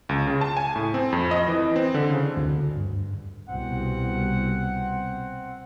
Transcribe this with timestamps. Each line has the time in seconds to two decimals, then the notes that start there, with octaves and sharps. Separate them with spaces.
0.09 C#2
0.27 C#3
0.41 A5
0.57 G#5
0.75 A2
0.94 C4
1.12 F2
1.31 D#5
1.48 E3
1.76 C4
1.94 D3
2.10 C#3
2.37 D2
2.76 G2
3.49 C2 B2 C4 F#5